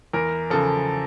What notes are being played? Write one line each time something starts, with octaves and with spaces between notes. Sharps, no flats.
E2 A#4
C#3 F3 A4